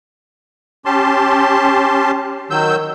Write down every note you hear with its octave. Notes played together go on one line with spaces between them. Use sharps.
C#4 G4 A5 C6
D#3 F#3 E6 G6